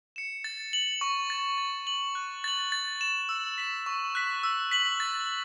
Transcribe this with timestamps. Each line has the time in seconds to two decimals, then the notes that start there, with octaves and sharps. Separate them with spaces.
0.16 C#7 E7
0.44 A6
0.73 F#7
1.01 C#6
1.30 A6 E7
1.58 A6
1.87 F#7
2.15 F#6
2.44 A6 F#7
2.72 A6
3.01 E7
3.29 E6
3.58 B6 E7
3.86 C#6
4.15 F#6 B6
4.43 E6
4.71 B6 F#7
5.00 A6